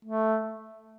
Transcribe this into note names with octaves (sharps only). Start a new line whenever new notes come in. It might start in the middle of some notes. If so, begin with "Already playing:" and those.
A3